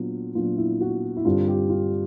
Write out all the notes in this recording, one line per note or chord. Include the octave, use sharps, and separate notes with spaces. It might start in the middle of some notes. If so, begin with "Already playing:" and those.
Already playing: A#2 F#3 B3 D4 F4
A#2 F#3 B3 D4 F4
E4
F#4
E4
G2 D3 G3 C4 F4
G4
F4